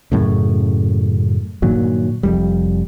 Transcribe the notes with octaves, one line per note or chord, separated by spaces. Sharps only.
F#2 A2 C#3
G2 A#2 D#3 F#3
F1 F2 G3